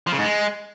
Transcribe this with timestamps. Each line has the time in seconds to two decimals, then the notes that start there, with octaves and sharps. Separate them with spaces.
0.07 F3
0.12 C#3
0.18 G#2
0.24 G#3